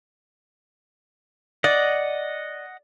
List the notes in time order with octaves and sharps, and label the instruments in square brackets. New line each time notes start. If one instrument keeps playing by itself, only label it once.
[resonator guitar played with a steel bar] D5 [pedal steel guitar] D#5 F#5